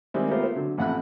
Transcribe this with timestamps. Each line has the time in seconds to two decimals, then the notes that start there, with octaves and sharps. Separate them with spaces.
0.14 D#3 G3 G#3 C4 E4
0.29 A3 B3 F4 G4 A#4 C5
0.43 C5 E5
0.55 D3 F#3
0.78 A1 F2 F#5 B5 F#6